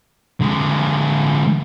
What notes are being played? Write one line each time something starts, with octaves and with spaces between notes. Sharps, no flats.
D3 G#3